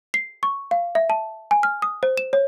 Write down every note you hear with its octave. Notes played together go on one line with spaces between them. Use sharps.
C7
C#6
F5
E5
A5
G#5
F6
D#6
C5
E7
C#5